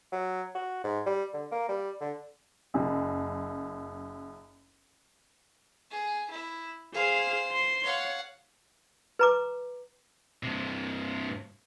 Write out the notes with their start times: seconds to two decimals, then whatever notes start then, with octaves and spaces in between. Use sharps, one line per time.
0.13 F#3
0.55 F#4
0.84 G#2
1.06 G3
1.34 D3
1.52 A#3
1.69 G3
2.01 D3
2.74 F#1 F#2
5.91 G#4
6.31 E4
6.94 G#4 C5 F5
7.52 C6
7.85 C#5 F5 F#5
9.19 B4 A#5 D6
10.43 G2 C3